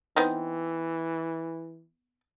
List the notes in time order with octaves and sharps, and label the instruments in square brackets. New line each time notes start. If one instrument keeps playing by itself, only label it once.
[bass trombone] E3 [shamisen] B3 C4 D#4